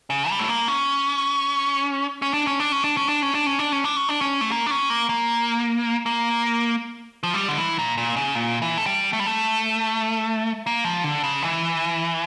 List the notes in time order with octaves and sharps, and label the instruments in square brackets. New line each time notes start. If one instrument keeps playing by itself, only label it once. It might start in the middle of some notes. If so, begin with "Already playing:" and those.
[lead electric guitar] C#3
G3
A3
A#3
C#4
C#4
D4
C#4
D4
C#4
D4
C#4
D4
C#4
D4
C#4
D4
C#4
D4
C#4
D4
C#4
A3
A#3
D4
C#4
A#3
A#3
A#3
F3
G3
D3
E3
A#2
A#2
C#3
A#2
E3
A3
G3
A3
G3
A3
A#3
F3
D3
C#3
E3